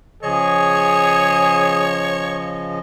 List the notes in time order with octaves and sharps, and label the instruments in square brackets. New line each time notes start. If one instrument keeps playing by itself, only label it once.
[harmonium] C#3 F3 D#5 [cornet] G#4 [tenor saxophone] C#5